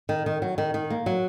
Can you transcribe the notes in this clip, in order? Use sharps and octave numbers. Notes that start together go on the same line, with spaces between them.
D#3
D#3
F#3
D#3
D#3
A#3
F#3